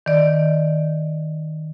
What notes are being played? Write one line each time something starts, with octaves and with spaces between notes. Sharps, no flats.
D#3 D5